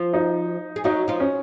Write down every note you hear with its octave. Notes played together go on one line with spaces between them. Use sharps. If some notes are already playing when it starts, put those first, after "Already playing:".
Already playing: F3 F4
D#4
G#4
F#3 D#4 F#4
F3 F4
C#4